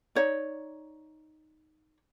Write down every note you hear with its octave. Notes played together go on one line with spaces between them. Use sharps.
D#4 C#5 D5